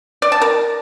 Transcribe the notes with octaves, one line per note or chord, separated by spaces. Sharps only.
D5
A5
A#4